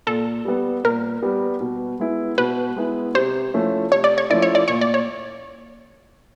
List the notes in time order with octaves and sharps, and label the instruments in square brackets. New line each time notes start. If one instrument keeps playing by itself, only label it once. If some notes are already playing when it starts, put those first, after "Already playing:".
[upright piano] A#2 [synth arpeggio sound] A4
[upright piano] G3 B3
[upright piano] A#2 [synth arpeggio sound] A#4
[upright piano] G3 B3
B2
G#3 B3 E4
[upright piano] B2 [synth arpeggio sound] B4
[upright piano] G#3 B3 E4
[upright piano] C3 [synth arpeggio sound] C5
[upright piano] F3 A3 C#4 E4
[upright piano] C3 [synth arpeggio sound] C#5
[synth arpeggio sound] D5
C#5
[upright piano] F3 A3 C#4 E4 [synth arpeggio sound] D5
[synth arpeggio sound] C#5
D5
[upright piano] A#2 [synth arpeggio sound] C#5
[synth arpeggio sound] D5
C#5